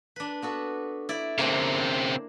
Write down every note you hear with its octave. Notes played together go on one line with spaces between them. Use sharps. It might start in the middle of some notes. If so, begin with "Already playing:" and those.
D4 B4
B3 F#4 A4
E4 D5
C#3 A#3 C4 D4 C5